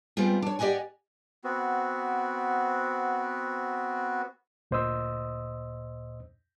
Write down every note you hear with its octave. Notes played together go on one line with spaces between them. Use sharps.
G3 G#3 B3 C4 F4
D4 C#5
G4 D5 D#5 F#5 G#5
B3 C4 F#4
D2 A#2 C5 D#5 D#6 E6